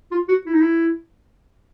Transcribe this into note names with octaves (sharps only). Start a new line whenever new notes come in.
F4
F#4
E4
D#4
E4